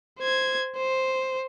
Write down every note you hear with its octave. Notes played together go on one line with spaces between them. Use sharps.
C5 G#6
C5